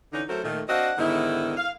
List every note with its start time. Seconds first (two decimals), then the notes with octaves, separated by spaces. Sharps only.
0.13 D3 E3 C#4 D#4
0.29 F#3 A3 F#4 A4 A#4 C5
0.44 A#2 D#3 A3
0.69 C4 D4 F#4 D#5 F5 F#5
0.98 G#2 D3 D#3 B3 E4
1.57 F5